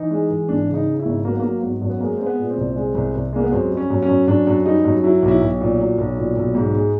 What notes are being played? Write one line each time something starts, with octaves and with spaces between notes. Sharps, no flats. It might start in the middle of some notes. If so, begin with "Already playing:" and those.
Already playing: E3 D#4
G#3
E3
G#1 D4
C#3
D#4
C#3
E4
G#1
F#3 A#3
B3
F#3 A#3
G#1 B3
F#2
B3
G#3 A#3
G#3 C4
B3
A#2
C4
C2
G#3
C2
C2
G#3 A#3
B3
F#2 C4
G3
C#4
F#2
C#4
F#2
F#2 D4
F#2
G3 D#4
F#2
F#3 E4
B1
E4
B1
A#2
F#3
B1
A#2
B1
G#2
G#3